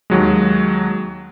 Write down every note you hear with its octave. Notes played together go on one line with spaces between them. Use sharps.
D#2 F#3 G#3